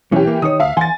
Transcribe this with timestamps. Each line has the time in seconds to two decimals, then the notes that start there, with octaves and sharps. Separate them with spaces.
0.12 B1 E3 C#4 G4
0.27 A#3
0.42 D#3 D#4 C#5 D#6
0.60 D2 E5 F5
0.77 E3 F#5 G#5 C6 A6